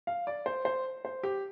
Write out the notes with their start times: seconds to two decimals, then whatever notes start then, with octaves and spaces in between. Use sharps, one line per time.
0.07 F5
0.27 D5
0.46 C5
0.65 C5
1.05 C5
1.23 G4